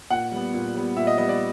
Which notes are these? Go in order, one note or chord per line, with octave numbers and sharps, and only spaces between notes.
A#2 F#5
G3 B3
A#2
G3 B3
A#2 E5
D#5
G3 B3 D#5
D5